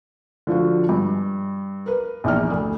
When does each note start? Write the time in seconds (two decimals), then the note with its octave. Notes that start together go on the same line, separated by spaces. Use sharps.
0.47 D3 F3 F4 F#4
0.89 G2
1.86 A#4 B4
2.24 A#1 E2 D#4 D5 F6
2.51 D2